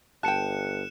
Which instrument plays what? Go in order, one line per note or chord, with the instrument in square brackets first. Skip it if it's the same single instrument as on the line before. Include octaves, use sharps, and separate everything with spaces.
[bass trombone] G1 [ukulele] G5 A5 [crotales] F#6 C#7 E7